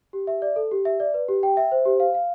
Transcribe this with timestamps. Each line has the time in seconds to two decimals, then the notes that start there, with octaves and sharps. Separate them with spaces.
0.13 G4
0.27 E5
0.42 D5
0.56 A4
0.72 G4
0.85 E5
1.00 D5
1.14 B4
1.29 G4
1.43 G5
1.57 E5
1.72 C5
1.85 G4
2.00 F5
2.14 F5